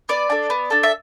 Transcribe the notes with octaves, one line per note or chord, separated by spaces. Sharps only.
B3 D5
D4 A4
B3
D4 A4
E5